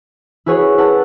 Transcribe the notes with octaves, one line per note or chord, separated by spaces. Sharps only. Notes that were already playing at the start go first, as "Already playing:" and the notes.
E4 F#4 G#4 B4 C#5 F#5
E4 A#4 B4 F#5 A5